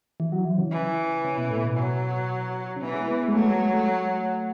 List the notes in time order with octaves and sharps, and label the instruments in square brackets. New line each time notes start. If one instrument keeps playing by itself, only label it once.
[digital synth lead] E3
F#3
E3
C#3
[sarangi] E3
[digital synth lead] C#3
B2
A2
B2
[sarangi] F#3
[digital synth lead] C#3
[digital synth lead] B2 [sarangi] E3
[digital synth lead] G#3
B3
G#3
[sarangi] F#3 [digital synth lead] A3
[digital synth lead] G#3
A3